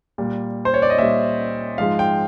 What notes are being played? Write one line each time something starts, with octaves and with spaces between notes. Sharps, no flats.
A#2 G3
C5
C#5
D5
D#5
A#2 G3 E5
G#2 F3 G#3 F5
G5